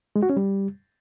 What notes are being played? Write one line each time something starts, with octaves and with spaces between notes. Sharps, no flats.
G#3
F#4
C#4
G3